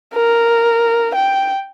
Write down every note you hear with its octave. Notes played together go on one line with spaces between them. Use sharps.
A#4
G5